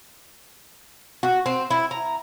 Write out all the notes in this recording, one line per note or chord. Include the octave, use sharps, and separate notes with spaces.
F#4
C4
E4
A#5